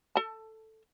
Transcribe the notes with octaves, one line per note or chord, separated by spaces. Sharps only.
A4 A5